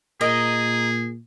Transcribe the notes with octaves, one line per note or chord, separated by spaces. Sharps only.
A#2 G#4 A#4 D#5